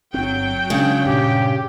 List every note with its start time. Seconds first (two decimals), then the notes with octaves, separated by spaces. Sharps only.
0.14 G1 F#3 C4 G5
0.70 C#3 G#3 D4
1.06 G2 A#2 G4